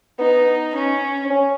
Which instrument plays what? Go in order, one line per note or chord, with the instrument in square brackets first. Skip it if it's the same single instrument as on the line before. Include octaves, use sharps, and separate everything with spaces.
[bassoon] B3 [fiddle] D#4
[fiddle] C#4
[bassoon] C#4